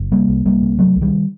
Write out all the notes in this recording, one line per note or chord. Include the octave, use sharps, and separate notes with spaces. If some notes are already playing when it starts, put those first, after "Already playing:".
Already playing: F#1
C3 G3 A#3
C2
C2 G3 A#3
C3
C3 F#3 A3
C2
D#3 G3